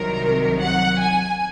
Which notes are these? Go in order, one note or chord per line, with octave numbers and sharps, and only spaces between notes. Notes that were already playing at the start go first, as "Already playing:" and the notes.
Already playing: C2 C3 D#3 F#3 A#4
F#5
G#5